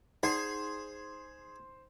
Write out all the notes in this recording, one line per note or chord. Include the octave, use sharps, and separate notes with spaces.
D#4 G#4 C5 D5 F#5 C7